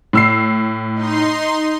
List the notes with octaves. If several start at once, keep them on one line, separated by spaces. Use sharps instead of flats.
A2 E6 C7
D#4 C6